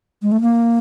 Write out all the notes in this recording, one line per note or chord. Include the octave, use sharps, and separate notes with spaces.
G#3
A3
A#3